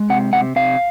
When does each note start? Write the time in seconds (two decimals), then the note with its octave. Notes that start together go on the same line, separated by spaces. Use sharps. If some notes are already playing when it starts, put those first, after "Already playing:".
Already playing: G#3
0.10 C3 F#5
0.33 C3 F#5
0.56 C3 F5